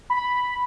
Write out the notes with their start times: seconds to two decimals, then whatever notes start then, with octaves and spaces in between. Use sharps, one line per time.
0.10 B5